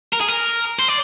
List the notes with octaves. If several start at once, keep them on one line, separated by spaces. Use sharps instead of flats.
A#4
G#4
A#4
C5
D5